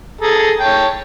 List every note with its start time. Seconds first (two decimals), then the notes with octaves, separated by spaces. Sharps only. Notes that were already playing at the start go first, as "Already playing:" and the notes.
0.21 G#4 A4 A#5
0.60 C#5 G5 A5